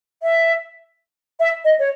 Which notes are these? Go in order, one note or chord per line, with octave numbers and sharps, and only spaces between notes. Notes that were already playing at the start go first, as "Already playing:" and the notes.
E5
E5
D#5
C#5